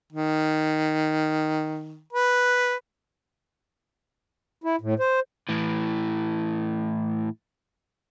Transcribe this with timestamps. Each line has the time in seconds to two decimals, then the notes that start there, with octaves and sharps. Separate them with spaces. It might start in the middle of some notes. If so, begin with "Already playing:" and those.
0.13 D#3
2.13 B4
4.64 E4
4.81 A2
4.99 C5
5.49 A2 E3